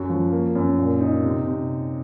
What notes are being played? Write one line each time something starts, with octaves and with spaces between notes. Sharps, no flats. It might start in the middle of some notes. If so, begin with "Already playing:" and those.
Already playing: F#2 F#4
F3
A#3
F#2
A#2
D#4
C3
C3